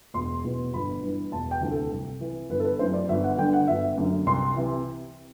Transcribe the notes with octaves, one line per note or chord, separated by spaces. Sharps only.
E1 C6
E2 B2
G1 B5
G2 E3
E1 A5
G5
D2 C3 E3
A4
C2
C3 E3
G1 B4
A4
B4
F#2 E3 C5
D5
G1 E5
F#5
G2 D3 G5
F#5
G1 E5
F#2 D3
C2 C6
C3 E3